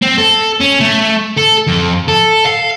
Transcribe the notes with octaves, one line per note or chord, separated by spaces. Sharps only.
C4
A4
C#4
A3
A4
F2
A4
F5